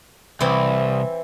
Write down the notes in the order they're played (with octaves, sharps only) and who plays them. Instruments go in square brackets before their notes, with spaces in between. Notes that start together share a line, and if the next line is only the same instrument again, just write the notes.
[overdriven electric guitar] C2 [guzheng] E3 C4